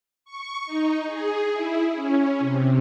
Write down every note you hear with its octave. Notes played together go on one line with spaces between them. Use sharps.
C#6
D#4
G#4
E4
C#4
C3